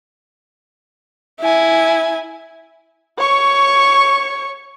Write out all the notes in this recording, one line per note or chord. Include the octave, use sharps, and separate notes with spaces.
E4 G#5
C#5 C#6